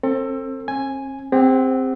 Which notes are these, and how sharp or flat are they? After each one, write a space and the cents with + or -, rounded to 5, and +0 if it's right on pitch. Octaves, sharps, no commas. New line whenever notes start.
C4 +30 A4 +30
C4 +45 G#5 +0
C4 +0 G#4 -45 F#5 +30